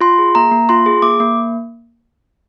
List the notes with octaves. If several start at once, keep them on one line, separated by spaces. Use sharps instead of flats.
F4 C6
G#4
A#3 A#5
A#3
F4 C6
G#4
A#3 D6
A#3